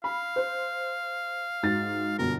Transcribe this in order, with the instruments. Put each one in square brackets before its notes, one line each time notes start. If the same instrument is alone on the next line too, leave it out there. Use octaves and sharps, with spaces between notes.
[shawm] F5 [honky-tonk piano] B5
[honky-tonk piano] C5
G#2 F#4 A6
[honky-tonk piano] G1 B2 [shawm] A#4